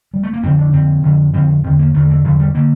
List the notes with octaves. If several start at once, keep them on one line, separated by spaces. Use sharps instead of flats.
G3
A3
A#3
F2 D3 C4
D4
F2 D3 C4
F2 D3
F2 D3 C4
E2 D3 C4
A#3
E2 D3 A3
E3
E2 D3 F3
G3
D3 A#3